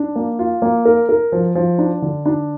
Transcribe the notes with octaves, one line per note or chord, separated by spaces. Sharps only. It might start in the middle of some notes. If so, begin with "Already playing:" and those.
Already playing: D4
A#3
F4
A#3
A#4
A#4
F3
F3
D4
D3
D4